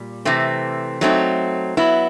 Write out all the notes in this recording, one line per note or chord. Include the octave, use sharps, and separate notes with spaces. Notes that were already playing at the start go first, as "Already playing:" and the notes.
Already playing: A#2 G3
C3 E3 A3 C4
F#3 A3 C4 D#4
F#3 B3 E4